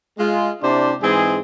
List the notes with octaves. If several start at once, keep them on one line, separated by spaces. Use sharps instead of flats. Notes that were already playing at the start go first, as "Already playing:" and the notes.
G#3 F4
C3 D4 E4 C5 D5 C6
G#2 E3 G#3 C4 G#4